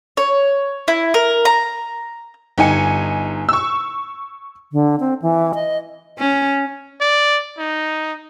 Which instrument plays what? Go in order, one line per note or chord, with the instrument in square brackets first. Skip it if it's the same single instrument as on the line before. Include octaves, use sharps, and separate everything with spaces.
[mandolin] C#5
E4
A#4
A#5
[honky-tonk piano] G1 D#4 G#5 C#7
C#6 E6
[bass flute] D3
C4
E3
D#5
[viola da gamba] C#4
[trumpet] D5
D#4